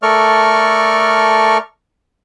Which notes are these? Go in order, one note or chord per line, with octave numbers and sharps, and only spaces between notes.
A3 A4 A#4 D5 C#6 F6